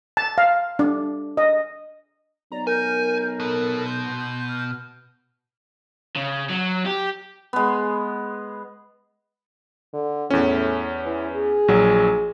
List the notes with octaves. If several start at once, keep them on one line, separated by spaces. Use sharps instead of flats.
A5
F5
D4
D#5
B1 D5 A#5
A#4 G#5 G6
B2 B3 A4
C6 G6
F6
C#3
F#3
G4
G#3 B3
D3
E2 A2 C#4
E3
G#4
A#1 F#3